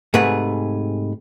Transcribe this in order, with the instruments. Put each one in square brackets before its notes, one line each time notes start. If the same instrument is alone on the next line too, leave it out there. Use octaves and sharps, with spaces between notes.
[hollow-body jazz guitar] G#2 C3 A3 G#4 B4 B5